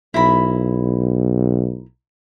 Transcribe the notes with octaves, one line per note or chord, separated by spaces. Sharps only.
B1 E4 A#4 B5